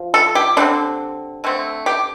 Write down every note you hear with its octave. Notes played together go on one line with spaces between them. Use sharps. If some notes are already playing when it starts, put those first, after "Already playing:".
Already playing: F3
A4
G4
D3 G3 C4 D4
D3 A3 C4
G4